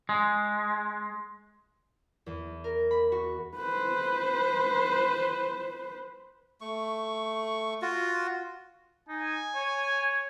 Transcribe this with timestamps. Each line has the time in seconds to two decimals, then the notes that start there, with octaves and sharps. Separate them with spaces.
0.09 G#3
2.26 E2
2.64 A#4
2.91 B5
3.12 F#4
3.56 B4 C5
6.61 A3 C#6
7.82 F4 F#4
9.09 D#4 G#5
9.55 C#5